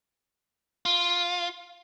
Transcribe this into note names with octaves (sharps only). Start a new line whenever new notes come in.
F4